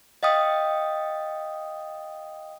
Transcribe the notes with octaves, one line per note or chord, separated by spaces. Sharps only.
D#5 F5 G5 D#6